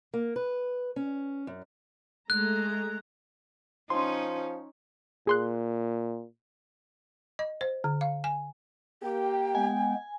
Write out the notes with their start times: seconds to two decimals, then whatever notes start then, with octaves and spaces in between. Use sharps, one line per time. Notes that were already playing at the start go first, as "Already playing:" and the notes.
0.14 A#3
0.36 B4
0.96 C#4
1.47 F#2
2.30 G#3 A3 A#5 F#6
3.90 F3 C#4 D#4 C6
5.27 A#2 G#4 C6 F#6
7.39 D#5
7.61 C5
7.84 D3
8.01 F5
8.24 G#5
9.03 A#3 G4 G5
9.55 G#3 B3 G#5